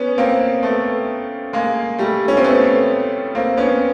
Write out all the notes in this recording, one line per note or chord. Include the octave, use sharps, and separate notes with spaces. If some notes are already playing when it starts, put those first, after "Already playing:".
Already playing: B3 C#4
A#3 C4
A3 B3
G#3 A#3
G3 A3
C#4
C4
A3 B3
A#3 C4
B3 C#4